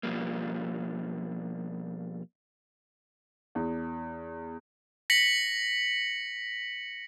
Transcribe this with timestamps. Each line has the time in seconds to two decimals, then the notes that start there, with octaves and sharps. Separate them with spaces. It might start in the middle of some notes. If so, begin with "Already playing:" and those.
0.03 B2 F3 G3 A#3
3.55 E2
5.10 A#6 B6 C#7 F#7